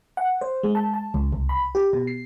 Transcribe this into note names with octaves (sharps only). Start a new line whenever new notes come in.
F#5
C5
G#3
A5
A5
C#2
C2
B5
G4
B2
C7